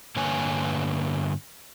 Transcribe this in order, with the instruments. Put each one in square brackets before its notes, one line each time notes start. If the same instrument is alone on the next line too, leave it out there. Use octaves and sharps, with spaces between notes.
[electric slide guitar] G2 D3 A#3 B4 C#5 G#5